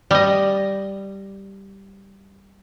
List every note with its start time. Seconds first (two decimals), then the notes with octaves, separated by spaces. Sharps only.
0.11 G3 D#5